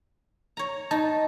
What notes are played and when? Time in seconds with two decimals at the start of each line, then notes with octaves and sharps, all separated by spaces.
0.57 C#5 A#5
0.91 D#4 A5